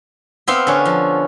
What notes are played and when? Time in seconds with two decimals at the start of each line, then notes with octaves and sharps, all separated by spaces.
0.48 B3 C4 E5 F5
0.67 D3 C#4
0.85 F3